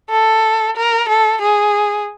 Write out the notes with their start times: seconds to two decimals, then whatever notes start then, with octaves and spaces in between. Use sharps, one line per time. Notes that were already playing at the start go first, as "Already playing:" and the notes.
0.10 A4
0.76 A#4
1.09 A4
1.41 G#4